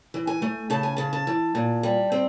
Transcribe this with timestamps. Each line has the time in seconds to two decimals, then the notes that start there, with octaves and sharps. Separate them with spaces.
0.14 E3
0.27 G#5
0.42 A3
0.70 C#3 A5
0.83 G#5
0.97 C#3 A5
1.13 A5
1.27 E3
1.55 A#2
1.83 G3
2.12 C4